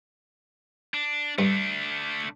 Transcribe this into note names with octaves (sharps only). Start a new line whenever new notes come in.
D4
G2 A3 D4